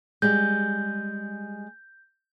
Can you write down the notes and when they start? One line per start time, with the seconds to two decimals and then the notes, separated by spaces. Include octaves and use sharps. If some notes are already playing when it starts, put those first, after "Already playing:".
0.22 G3 G#3 G6